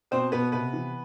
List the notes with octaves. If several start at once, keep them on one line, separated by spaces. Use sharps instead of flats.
B2 C4 C5
B2 B3 B4
C3 B3 B4
E3